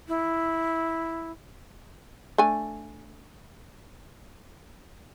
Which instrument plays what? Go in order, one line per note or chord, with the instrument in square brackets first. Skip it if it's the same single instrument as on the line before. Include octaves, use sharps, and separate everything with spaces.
[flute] E4
[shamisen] A3 D4 G#5